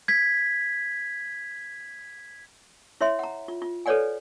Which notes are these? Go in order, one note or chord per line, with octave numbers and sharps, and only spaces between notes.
G#6 B6
E4 C#5 E5 C6
F#5 A#5
F4
F4
A4 B4 C#5 D5 F#5 G#5